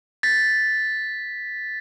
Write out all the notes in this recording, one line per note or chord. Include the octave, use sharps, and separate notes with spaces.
A6 B6